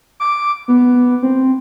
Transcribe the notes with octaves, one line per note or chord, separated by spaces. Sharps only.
D6
B3
C4